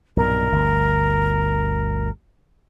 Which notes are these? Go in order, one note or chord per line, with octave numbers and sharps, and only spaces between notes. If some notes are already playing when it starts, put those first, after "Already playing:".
B1 G2 A#2 A#4
G1 D2